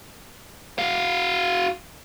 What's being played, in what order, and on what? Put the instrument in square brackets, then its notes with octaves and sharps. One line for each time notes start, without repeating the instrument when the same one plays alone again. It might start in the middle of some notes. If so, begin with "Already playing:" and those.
[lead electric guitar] F#4 F5